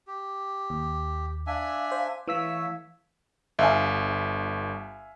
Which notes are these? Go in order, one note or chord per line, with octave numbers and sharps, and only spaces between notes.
G4
D#2
D4 E5 F5 G#5
C5
E3 A3 C#5 F5 E6 B6
G1 E5 F5 G#5